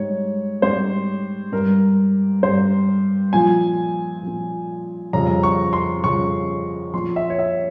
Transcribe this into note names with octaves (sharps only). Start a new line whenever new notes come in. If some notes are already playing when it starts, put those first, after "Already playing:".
Already playing: G#2 G3 C#5
G#2 G3 C5
G2 G3 A#4
G2 G3 C5
A#2 F3 G#5
A#2 F3
F2 C#3 G3 A#5
C#6
C6
F2 C#3 G3 C#6
A#2 F3 C6
E5
C#5
E5